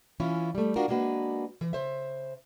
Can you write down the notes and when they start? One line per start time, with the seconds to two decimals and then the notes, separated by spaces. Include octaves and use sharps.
0.20 E3 C#4 E4 F4
0.55 G3 A3
0.76 D4 F4 F#4 A#4
0.88 G#3 A#3 D4 F#4 B4
1.61 E3
1.73 C#3 C5 E5